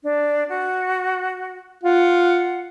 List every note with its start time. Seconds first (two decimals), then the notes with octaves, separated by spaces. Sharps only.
0.03 D4
0.49 F#4
1.84 F4 F#5